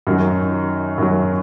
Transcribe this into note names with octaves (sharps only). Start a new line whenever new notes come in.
F#2 D#3 F#3
F#2 D#3 F#3